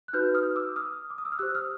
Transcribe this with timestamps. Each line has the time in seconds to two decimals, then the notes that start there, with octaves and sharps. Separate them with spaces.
0.08 F#6
0.13 D#4 F#4 B4 F6 G6
0.34 D#6 F6
0.56 D6 E6
0.76 D#6 F6
1.10 D6
1.18 D#6
1.25 E6
1.32 F6
1.39 G4 C5 E6 F#6
1.55 D#6 F6